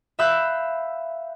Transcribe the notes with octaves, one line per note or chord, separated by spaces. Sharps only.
E5 F5 B5 E6 F#6 G6